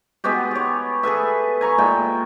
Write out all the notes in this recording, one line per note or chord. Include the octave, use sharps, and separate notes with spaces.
G#3 B3 F#4 G4
G4 C#5
G#4 A4 B4 E5
G#5 A#5 C#6
A#2 G#3 G5